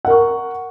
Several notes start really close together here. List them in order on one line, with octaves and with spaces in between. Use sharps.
F#5 A#4 C#6